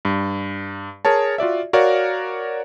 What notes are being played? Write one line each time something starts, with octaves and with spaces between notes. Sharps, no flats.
G2
G#4 A#4 C#5 A5
F4 F#4 D5 E5
F#4 A#4 C#5 D5 F5